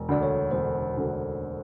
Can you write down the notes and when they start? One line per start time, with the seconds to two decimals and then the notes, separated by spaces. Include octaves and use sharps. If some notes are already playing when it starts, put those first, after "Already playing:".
Already playing: E1
0.08 D2 D3 D5
0.23 C#5
0.51 E1 C5
0.97 D2 D3